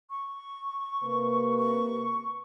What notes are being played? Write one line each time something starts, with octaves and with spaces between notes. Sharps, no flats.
C#6
C3 A#3 B4
C#6